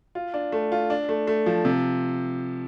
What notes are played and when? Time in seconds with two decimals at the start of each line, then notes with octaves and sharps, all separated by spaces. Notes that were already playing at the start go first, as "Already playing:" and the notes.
0.15 F4
0.34 D4
0.52 A3
0.72 F4
0.90 D4
1.09 A3
1.27 A3
1.46 F3
1.65 C3